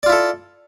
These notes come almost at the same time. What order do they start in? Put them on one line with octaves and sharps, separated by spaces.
D5 F4 E4 A4